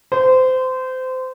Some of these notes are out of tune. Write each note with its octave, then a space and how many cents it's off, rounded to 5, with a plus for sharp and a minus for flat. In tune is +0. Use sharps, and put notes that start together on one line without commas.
C5 -25